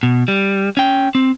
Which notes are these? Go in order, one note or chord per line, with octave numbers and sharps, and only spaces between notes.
B2
G3
C#4 G5
C4